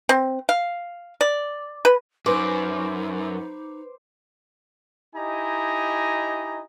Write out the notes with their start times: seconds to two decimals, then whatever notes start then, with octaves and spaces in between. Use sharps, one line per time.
0.09 C4
0.49 F5
1.21 D5
1.85 B4
2.26 F#2 D#4 B4 C5 D6
5.15 D#4 E4 G4 D#5 G#5 A#5